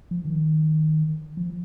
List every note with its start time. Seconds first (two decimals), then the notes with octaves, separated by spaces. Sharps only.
0.11 F3
0.25 D#3
1.37 F3